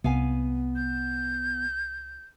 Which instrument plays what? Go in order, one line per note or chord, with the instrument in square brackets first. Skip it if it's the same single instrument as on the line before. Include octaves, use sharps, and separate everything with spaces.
[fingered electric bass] C2 [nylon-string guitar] B3 F5 G#5
[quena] G6